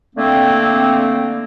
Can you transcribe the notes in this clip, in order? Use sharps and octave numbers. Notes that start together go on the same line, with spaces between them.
D3 A3 A#3 C4